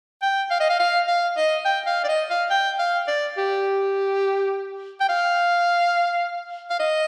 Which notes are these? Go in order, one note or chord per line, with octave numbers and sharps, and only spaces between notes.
G5
F5
D#5
F5
F5
F5
D#5
G5
F5
D5
D#5
F5
G5
F5
D5
G4
G5
F5
F5
D#5